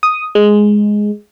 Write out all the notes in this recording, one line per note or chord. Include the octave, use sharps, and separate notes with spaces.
D#6
G#3